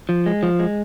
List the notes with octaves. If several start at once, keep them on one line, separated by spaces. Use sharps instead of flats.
F3
G#3
F3
G#3